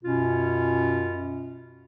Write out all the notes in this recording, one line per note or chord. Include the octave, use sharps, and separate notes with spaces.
F#2 B2 C#4 F4